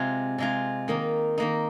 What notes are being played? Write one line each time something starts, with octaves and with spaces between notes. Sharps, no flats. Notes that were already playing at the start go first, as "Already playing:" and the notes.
Already playing: C3 G#3 C4 F4
C3 G#3 F4
D#3 A#3 D#4
D#3 A#3 D#4